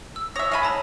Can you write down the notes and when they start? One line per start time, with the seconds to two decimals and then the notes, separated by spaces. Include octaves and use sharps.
0.16 E6
0.36 C#5 E5 D#6 A#6
0.52 G#3 A3 B5 F6 D#7
0.63 C#5 A5 A#5